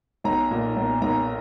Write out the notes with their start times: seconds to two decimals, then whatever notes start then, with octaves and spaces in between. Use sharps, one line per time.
0.24 B1 A#5
0.51 A#2
0.76 B1
1.02 B1 A#5